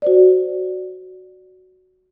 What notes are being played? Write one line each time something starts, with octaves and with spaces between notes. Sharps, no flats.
F#4 C5 D5